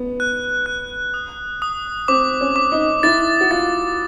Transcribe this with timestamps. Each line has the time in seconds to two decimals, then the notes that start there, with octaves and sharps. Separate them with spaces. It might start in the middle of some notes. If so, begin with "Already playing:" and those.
Already playing: B3
0.20 F#6
0.66 F#6
1.14 D#6
1.62 D#6
2.08 C4 D6
2.41 C#4
2.56 D6
2.72 D#4
3.03 E4 A6
3.41 F#4
3.51 F4 A6